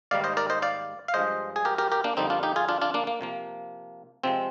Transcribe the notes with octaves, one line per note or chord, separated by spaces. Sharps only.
G#2 D#3 G3 A#3 D5 F5
C5 D#5
A#4 D5
C5 D#5
D5 F5
F5
G2 F3 G#3 C5 D#5
G#4
G4 A#4
G4 A#4
G4 A#4
A#3 D4
F2 D3 G3 A#3 C4 D#4
D4 F4
D#4 G4
F4 G#4
D4 F4
D4 F4
A#3 D4
A#3
C3 F3 A#3
C3 F3 G#3 C4